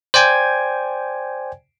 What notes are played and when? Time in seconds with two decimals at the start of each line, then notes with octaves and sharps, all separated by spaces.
0.14 C5 D5 G5 G#5 G#6